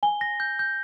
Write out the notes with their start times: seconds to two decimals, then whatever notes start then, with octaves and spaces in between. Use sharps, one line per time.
0.03 G#5 G7
0.21 A#6
0.40 G6
0.59 G6